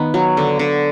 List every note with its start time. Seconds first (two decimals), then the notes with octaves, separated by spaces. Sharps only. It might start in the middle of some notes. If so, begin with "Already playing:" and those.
Already playing: D#3 B3
0.14 F#3
0.37 D3
0.59 D3